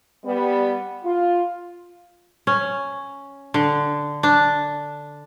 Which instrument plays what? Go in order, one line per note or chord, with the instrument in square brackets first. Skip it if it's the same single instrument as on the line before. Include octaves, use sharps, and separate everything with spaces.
[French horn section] G3 B3
F4
[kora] C#4
D3
D4